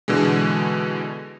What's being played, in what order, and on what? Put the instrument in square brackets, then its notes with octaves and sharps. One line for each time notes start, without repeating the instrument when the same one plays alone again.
[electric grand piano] B2 D3 E3 G#3